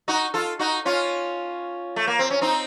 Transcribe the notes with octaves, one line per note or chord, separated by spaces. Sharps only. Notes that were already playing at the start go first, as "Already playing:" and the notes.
D#4 F#4
F4 A4
D#4 F#4
C#4 F4
A3
A#3
C4
C#4
C4 D#4